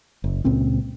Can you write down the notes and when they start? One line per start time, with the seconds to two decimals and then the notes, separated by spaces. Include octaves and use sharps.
0.24 F#1
0.44 C#2 A#2 C4 C#4